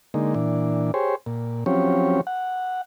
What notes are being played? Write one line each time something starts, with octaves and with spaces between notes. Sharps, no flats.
D3 G#3 A#3 D#4
A#2 E3 D4
G4 G#4 C5 C#5
A#2
F3 F#3 C4 C#4 G4 C#5
F#5